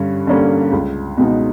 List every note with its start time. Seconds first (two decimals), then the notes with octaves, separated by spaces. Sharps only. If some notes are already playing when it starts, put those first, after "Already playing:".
Already playing: G2 D3 G3 C#4
0.27 D3 G3 A#3 C#4
0.72 C#2
1.17 B2 G#3 B3 D#4